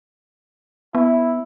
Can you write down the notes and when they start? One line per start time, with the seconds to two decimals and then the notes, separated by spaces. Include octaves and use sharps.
0.95 B3 E4